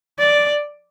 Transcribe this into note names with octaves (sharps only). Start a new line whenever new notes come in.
D5